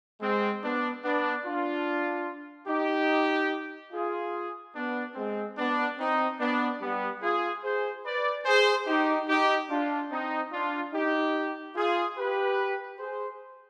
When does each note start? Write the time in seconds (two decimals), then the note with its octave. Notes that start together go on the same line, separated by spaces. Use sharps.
0.21 G#3 C4
0.62 B3 D4
1.04 B3 D4
1.45 D4 F4
2.68 D#4 G4
3.92 F4 G#4
4.75 B3 D4
5.16 G#3 C4
5.57 B3 D4
5.98 C4 D#4
6.40 B3 D4
6.81 G3 B3
7.22 F4 G#4
7.63 G#4 C5
8.05 B4 D5
8.46 G#4 C5
8.87 D#4 G4
9.28 D#4 G4
9.70 D4 F4
10.11 C4 D#4
10.52 D4 F4
10.93 D#4 G4
11.75 F4 G#4
12.17 G4 B4
12.99 G#4 C5